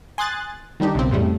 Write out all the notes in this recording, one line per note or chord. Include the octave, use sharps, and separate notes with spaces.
G#5 C6 D#6 F#6 A6
D#3 G3 D4 D#4 G4
B1 C#3 C4
F2 A2 C#3 G3 A3